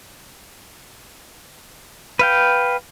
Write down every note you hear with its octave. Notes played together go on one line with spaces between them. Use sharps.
B4 F5 G5